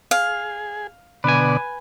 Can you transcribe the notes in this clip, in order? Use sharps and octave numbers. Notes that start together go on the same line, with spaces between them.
G#4 F5
B2 D3 B4 D5 G#5